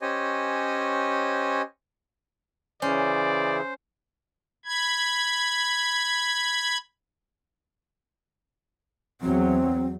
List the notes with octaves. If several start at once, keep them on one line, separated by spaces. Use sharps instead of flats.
C#4 G4 C5 C#5 D#5 G#5
C#3 E3 C#4 C5 D5
B5 G#6
E2 F#3 C4